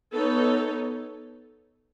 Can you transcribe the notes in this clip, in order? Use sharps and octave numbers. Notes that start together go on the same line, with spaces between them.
B3 D#4 A4 C#5